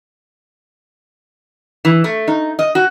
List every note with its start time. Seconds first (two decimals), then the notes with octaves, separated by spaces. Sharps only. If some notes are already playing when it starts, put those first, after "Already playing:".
1.85 E3
2.04 A3
2.28 D#4
2.59 D#5
2.75 F#4